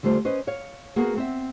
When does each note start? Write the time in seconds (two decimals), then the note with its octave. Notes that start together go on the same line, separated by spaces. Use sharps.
0.03 D3 G3 A3 F4 C5
0.25 C#4 B4 C5 D#5
0.47 C#5 F5
0.96 A#3 B3 F#4 G#4
1.17 C4 E5